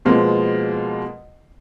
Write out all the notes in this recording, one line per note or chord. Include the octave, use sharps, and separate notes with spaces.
B2 F3 G#3 A#3